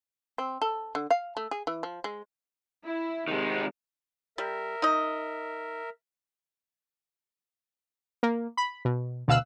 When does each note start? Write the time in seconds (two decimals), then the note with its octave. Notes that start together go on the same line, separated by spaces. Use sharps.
0.38 C4
0.62 A4
0.95 D3
1.11 F5
1.37 A3
1.51 G#4
1.67 E3
1.83 F3
2.04 G#3
2.85 E4
3.28 C3 D#3 G#3
4.38 G3 A#4 E5
4.82 D#4 D#5
8.23 A#3
8.57 B5
8.85 B2
9.28 D2 B2 F5 E6 F#6